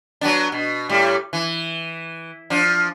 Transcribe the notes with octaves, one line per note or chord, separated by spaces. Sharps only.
F#3 B3 D4
B2
A2 G3
E3
F3 D4